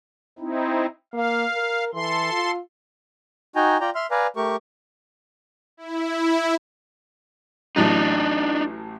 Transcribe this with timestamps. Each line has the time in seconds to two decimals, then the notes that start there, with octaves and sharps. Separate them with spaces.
0.39 C4 D#4 E4
1.14 A#3 F5
1.53 A#4
1.94 E3 A4 C6
2.33 F4
3.56 D#4 F#4 G5 G#5 A#5
3.81 F4 D5 G5 A#5
3.95 E5 C6 F6
4.11 B4 D5 F5 G#5 A#5
4.36 A3 G4 A#4 C#6
5.77 E4
7.76 A1 A2 F#3 D4 D#4